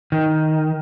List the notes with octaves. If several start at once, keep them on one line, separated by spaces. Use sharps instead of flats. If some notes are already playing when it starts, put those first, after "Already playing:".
D#3